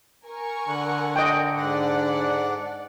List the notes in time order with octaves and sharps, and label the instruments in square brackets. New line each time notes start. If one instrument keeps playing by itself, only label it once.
[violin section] A#4 G#5 C#6
[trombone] D3 [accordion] F#5
[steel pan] D#5 G5
[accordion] G#2 D4 F#5 [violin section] D5